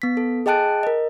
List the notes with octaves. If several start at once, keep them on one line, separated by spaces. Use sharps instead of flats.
B3 B6
A4
G#4 D#5 G5 A5 F#6 D7
A#4 D#5